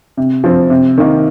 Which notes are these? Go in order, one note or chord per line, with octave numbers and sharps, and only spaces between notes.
C3
F3 C4
C3
D#3 A#3